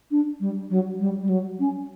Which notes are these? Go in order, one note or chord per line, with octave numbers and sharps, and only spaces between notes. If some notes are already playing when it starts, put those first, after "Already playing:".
D4
G3
F#3
G3
G3
F#3
C#4